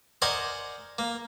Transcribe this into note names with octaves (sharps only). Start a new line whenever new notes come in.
A#4 C5 D5 D#5 F#5 G#5
A#3